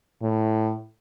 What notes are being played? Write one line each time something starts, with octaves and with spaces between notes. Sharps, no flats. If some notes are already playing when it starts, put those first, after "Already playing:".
A2